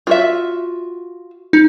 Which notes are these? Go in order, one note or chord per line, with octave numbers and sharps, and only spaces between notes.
F4 F#4 E5
D#4